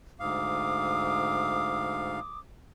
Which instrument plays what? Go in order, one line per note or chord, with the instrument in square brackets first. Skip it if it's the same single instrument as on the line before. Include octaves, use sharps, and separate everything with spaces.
[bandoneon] D2 G#2 F5 [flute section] D6 D#6